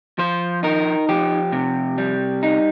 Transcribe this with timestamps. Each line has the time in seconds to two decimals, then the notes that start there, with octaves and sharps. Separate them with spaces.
0.18 F3 C5
0.63 D#4 A#4
1.09 F3 G4
1.52 C3
1.98 G3
2.43 D#4